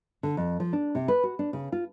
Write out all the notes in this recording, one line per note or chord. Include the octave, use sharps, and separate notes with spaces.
D3
F2
F3
D4
C3
B4
F#4
D4
C#3
F4